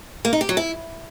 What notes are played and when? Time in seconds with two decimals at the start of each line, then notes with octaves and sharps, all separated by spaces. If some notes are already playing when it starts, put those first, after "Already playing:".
0.25 A#3
0.33 D#4
0.41 G4
0.49 F#3
0.57 E4